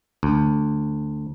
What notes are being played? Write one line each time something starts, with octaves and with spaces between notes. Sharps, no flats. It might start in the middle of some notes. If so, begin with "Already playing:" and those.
D2